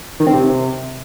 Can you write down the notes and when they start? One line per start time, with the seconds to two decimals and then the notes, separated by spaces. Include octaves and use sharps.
0.20 D#3
0.27 C4
0.34 C3